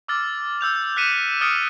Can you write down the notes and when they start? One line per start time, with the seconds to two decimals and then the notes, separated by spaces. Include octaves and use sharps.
0.08 D6 E6 F6 A6
0.61 E6 G6 F7
0.96 F#6 G6 B6 C#7 D#7 E7
1.41 D#6 F6 A6 C#7 D7